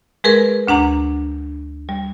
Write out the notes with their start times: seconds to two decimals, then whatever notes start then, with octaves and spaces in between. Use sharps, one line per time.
0.24 G#3 G#4 A#4 B4
0.67 D2 D4 F#5 A#5
1.89 G3